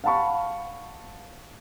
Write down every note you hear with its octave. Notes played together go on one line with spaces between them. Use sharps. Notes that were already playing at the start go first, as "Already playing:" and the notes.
F5 F#5 A5 B5 C#6